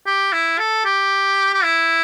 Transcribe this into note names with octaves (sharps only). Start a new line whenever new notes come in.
G4
E4
A4
G4
G4
E4